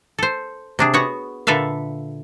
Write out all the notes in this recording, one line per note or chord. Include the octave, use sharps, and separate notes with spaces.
A4 C5
C3 D4 G#4
B3 F#4 C#5 F#5
A#2 D3 A4 B4 E5 F5